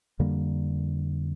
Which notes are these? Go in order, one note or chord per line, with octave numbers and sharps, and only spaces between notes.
F2 D3 G3 A#3